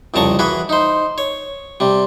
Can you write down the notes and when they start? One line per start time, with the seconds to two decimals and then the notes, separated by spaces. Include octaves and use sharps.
0.14 C2 F2 C#3 A5 A#5 C#6
0.39 E3 F#4 G#4 B4
0.69 D#4 C5
1.18 C#5
1.80 C3 G3